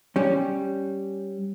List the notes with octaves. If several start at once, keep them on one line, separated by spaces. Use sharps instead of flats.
G3 C#4